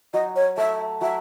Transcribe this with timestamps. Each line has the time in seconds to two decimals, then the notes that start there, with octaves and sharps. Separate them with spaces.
0.14 F#3 D#5
0.36 C#5
0.57 A3 E5
1.01 F#3 E5